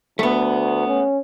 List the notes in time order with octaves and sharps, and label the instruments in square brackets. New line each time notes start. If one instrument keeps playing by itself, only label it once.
[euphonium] D2 [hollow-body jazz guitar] A3 B3
[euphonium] C#4